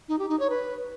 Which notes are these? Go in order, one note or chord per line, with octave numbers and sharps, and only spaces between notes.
D#4
G4
D#4
C#5
B4